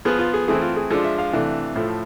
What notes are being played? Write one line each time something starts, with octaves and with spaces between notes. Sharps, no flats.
F3 B3 F4 G#4
F4
G#4
E3 A3 C4 E4 G#4
F4
G#4
F3 G#3 D4 F4 A4
E5
F5
C3 E3 A3 D4
A2 F3 A3